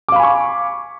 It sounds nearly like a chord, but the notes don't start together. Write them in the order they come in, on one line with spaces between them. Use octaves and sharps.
D6 F5 B5 G#5 C#6